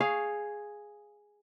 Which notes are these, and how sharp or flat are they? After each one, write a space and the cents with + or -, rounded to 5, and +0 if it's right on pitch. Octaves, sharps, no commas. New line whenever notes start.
G#4 +0 C#5 +0 F5 +0